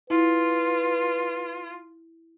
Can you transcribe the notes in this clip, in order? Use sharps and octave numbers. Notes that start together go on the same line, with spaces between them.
E4 F4 B4